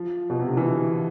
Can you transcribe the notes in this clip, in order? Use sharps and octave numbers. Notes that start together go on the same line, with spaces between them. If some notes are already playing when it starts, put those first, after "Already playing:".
Already playing: F3
B2
C3
D3
E3